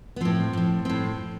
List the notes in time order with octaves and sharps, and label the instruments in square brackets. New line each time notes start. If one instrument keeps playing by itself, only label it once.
[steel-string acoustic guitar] B3
A2 F3 C4
A2 F3
A2 F3 C4